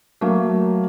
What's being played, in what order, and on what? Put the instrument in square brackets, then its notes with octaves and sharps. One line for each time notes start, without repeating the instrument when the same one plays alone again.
[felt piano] F#3 A3 A#3